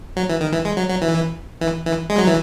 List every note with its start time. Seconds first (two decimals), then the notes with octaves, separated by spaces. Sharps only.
0.17 F#3
0.29 E3
0.41 D#3
0.53 E3
0.65 G#3
0.77 F#3
0.89 F#3
1.02 E3
1.61 E3
1.86 E3
2.10 G#3
2.18 F#3
2.27 E3